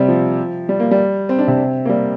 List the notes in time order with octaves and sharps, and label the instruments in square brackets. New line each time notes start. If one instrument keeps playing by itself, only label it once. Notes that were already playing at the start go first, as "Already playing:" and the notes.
Already playing: [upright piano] C3 G3 C4
F3
G3
A#3
G3
C4
D4
C3 C4
A#3
G3